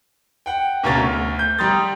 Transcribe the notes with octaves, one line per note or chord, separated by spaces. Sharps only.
F#5 G5
D2 B2 A#3 C#4 A6 F7
D2
G6
G3 G4 A#5 C6 D#6 A6